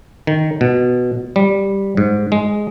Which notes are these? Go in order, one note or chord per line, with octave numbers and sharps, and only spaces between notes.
D#3
B2
G3
G#2
G#3